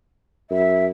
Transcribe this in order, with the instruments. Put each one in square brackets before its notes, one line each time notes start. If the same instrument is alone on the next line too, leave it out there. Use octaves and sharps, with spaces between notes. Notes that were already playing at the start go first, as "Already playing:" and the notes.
[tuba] F#2 [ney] E5